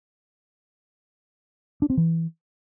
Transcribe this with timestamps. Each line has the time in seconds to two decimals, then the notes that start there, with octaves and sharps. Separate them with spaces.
1.82 D4
1.90 C4
1.97 E3